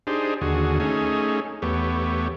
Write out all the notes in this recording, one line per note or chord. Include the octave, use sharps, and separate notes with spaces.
D4 D#4 G4 G#4 C5
D#2 D3 F#4 G#4
A3 C#4 D#4 G#4
E2 A3 B3 G4 C#5